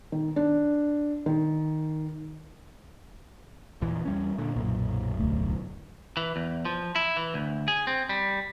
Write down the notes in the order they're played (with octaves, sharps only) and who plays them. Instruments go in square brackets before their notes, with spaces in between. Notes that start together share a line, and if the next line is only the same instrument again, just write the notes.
[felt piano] D#3
D4
D#3
[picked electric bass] A#1 E2 E3
E2 G3 C#4
A#2 D3
[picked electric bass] B1 F#2 [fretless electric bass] A#2
[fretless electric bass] D1 D2 A3
[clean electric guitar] E3
E2
F3
E4
E3
D2
G#4
C4
G3